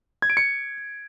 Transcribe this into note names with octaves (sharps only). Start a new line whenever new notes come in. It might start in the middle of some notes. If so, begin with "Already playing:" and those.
G#6
D7
C#7